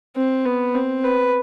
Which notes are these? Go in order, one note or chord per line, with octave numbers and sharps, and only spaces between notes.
C4
B3
C4
B4